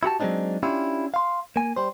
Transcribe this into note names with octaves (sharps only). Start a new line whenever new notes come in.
E4 F#4 G4 A5
F#3 G#3 A#3 C4 D4 D#4
C#4 D4 E4 F4 G4
F5 C6
A#3 G#5
G3 C5